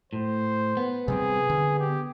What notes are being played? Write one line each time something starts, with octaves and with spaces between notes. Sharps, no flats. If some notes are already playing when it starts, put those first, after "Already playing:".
A2 C5
B3
C3 G3 C4 G#4
D3
G4